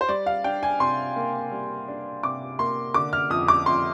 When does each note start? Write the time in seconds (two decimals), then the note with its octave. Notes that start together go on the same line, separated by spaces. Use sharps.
0.01 C5
0.09 G3 D5
0.26 F5
0.44 D4 G5
0.63 G#5
0.80 C3 C6
1.16 A#3
1.52 G3
1.88 D4
2.23 C3 D6
2.59 A#3 C6
2.94 D3 D6
3.13 F6
3.30 F2 D#6
3.48 D6
3.66 F2 C6